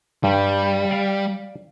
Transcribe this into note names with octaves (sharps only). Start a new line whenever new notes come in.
G2 G3
D5 F5